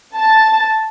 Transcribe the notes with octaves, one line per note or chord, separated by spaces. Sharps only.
A5